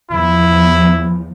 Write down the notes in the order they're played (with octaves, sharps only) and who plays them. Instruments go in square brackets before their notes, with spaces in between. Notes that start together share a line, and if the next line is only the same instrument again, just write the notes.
[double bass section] E2 F3 [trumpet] E4